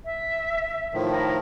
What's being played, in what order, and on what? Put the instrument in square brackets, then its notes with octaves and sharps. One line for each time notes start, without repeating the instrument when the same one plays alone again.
[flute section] E5
[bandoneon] A2 D#3 F3
[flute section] E4 A#4